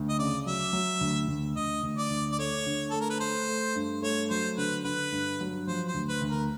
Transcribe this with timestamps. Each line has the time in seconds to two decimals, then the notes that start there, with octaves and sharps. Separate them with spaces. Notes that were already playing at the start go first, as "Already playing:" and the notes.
Already playing: D2
0.09 D#5
0.19 C#3 D5
0.46 F#3 E5
0.73 F#3
1.01 D2
1.28 D2
1.56 D2 D#5
1.83 D2
1.97 D5
2.10 D2
2.32 D5
2.39 A3 C#5
2.66 D3
2.90 A3 A4
3.01 A#4
3.10 B4
3.20 A3 C5
3.48 A3
3.75 G2
4.02 A3 C#5
4.30 F#3 C5
4.57 D3 B4
4.84 D3 B4
5.12 G2
5.40 F#3
5.67 F3 C5
5.87 C5
5.94 D2
6.08 B4
6.22 D2
6.30 A#4